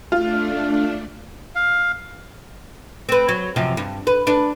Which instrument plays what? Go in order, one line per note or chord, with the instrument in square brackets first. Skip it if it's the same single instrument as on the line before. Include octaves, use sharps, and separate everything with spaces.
[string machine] A3 D4 [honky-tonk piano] F4
[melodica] F5
[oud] C4 B4
F#3
F#2 C3 F3
G2
B4
D4 B4